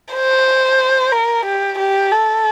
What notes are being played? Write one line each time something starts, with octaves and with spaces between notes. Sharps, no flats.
C5
A#4
G4
G4
A4